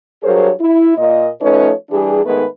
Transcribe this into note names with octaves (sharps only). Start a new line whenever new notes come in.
G2 F#3 G#4 A#4 C5 C#5
E4
A#2 D#5
F3 A3 C#4 D#4 B4 C#5
E3 G3 D4 G4 G#4
G#2 D#3 G#3 A3 B3 B4